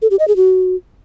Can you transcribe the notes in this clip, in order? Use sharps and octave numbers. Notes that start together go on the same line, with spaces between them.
A4
G4
D#5
G#4
F#4